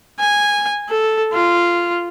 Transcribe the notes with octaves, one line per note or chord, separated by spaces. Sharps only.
G#5
A4
F4